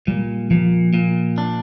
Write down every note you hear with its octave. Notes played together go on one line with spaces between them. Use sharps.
A#2 G3
A#2 F3
A#2
D4